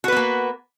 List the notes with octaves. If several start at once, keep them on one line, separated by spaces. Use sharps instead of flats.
A#3 B3 F#4 B4